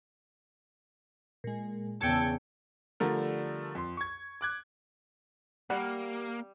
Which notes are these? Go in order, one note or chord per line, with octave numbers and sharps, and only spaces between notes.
A#2 G#3
E2 C#3 G5 A5 E6 G#6 C#7
D3 F3 G3 A3 A4 A#4
F2 C6
C#6 G#6
D6 F#6 G#6
G3 A#3 G4 F#5